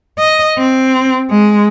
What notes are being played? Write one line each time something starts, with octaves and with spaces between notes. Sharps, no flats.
D#5
C4
G#3